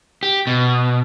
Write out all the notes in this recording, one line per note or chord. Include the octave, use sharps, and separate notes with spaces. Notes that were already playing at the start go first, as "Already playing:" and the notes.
G4
B2